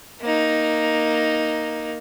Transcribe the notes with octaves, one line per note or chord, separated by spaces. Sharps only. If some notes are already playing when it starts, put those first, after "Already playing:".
A#3 D#4